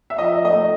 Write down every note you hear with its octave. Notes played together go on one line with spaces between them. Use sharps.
E5
F3 D#5
A3 D#5